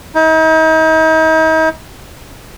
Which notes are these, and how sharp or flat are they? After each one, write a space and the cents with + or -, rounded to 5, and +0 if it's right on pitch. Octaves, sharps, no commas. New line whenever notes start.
D#4 +40